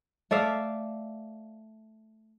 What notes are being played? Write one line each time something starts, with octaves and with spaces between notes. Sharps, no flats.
A3 D5 E5 F5